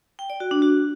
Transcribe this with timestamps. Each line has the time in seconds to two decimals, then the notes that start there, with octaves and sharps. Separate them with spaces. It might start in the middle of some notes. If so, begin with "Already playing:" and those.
0.19 G5
0.30 D5
0.40 F#4
0.51 D4
0.62 F#4